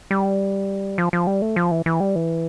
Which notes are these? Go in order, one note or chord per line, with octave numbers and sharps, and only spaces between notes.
G3
F3
F3
G3
A3
F3
E3
E3
G3
E3